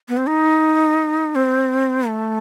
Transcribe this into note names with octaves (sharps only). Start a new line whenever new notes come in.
B3
C4
D#4
C4
A3